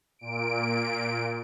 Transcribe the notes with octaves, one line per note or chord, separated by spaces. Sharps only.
A#2 D7